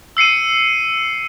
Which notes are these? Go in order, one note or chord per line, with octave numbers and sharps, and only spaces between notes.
E6 C7 C#7 D#7